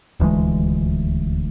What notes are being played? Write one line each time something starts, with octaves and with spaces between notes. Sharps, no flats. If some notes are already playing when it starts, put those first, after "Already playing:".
D#1 D2 E3 G#3